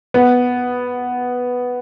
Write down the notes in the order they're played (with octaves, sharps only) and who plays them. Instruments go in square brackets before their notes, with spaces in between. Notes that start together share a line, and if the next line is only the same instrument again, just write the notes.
[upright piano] B3